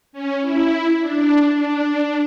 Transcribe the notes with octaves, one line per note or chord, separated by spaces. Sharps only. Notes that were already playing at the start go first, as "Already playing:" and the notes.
C#4
E4
D4
D4
D4